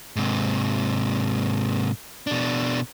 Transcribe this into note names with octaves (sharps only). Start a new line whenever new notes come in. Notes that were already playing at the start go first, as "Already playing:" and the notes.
G#2 C3
B2 D4